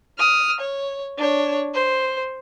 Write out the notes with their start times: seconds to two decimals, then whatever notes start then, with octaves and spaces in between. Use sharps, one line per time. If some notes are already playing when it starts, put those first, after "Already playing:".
0.18 D#6 F6
0.60 C#5
1.18 D4 C#5
1.74 C5